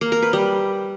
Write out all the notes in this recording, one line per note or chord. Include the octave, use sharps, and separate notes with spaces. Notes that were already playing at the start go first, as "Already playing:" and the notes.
A#3
A#4
B4
G3